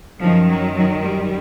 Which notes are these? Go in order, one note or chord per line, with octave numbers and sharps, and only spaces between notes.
F#2 D#3 F3
F#3
F#3
G3